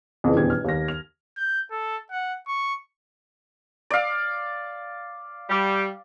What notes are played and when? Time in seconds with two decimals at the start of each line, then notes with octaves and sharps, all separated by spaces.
0.24 F2 C#3 E3
0.36 D#1 E2 D4 G4 G#6
0.50 F6
0.64 D#2 A#6
0.88 F7
1.37 G6
1.71 A4
2.11 F#5
2.48 C#6
3.90 D5 F5
5.50 G3